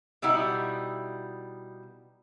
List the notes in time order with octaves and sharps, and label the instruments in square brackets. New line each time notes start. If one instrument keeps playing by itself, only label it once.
[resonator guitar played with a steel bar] B2 G3 D#4 E4 F#5